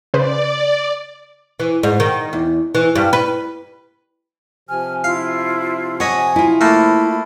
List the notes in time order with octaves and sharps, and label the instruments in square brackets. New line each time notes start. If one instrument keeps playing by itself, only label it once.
[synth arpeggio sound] C#3 B4 C5 [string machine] D5
[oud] E3
G#2
D#3
E2
E3
G2
B4
[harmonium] C3 F3 [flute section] G#5 F6
[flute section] E4 F4 [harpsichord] F5
[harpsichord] C#5 D#5 B5 [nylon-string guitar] F#5 [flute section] G#5
[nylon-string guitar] E4 F4
[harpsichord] A3 A#3 A5 [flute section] B5